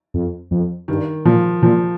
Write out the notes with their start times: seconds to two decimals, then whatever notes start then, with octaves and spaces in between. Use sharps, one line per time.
0.14 F2
0.51 F2
0.88 G2 D#3
1.25 A#2 F3
1.62 A#2 F3